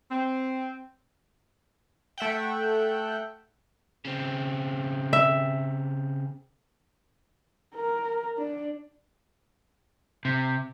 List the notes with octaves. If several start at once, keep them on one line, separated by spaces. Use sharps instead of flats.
C4
A3 E5 F#5 G5
C#3 C4
E5
A#4
D4
C3